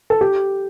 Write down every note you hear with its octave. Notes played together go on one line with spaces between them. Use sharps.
A4
G4